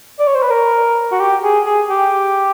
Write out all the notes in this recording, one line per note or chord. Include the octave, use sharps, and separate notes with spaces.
D5
C#5
C5
B4
A#4
F#4
G4
G#4
G#4
G4